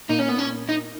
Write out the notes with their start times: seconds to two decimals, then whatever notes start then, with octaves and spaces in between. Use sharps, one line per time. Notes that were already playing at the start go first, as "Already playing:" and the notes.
0.09 A#2 A#3 D#4
0.19 C#4
0.29 B3
0.38 C#4
0.69 D#4